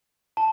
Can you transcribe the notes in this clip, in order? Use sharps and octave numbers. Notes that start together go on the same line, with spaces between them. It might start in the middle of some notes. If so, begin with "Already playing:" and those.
A5